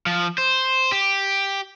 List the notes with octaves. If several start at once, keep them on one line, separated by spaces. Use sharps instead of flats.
F3
C5
G4